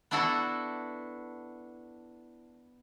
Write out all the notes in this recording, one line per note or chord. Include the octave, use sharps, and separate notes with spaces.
B3 D4 E4 F#4 A4